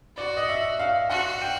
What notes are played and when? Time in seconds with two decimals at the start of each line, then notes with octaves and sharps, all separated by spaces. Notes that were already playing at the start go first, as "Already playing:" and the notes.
0.17 F#4 D5
0.37 D#5
0.49 E5
0.79 F5
1.10 F#4 F#5
1.42 G5